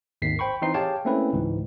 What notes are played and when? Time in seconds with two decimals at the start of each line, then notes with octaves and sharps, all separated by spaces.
0.22 G#1 D#2 D#3 B6 C7
0.39 C5 G5 B5 C#6
0.62 E3 C4 D#4 C6 C7
0.74 G4 G#4 C#5 F5 G5 A5
1.05 A3 A#3 C4 C#4 E4 B4
1.33 C#2 G#2 E3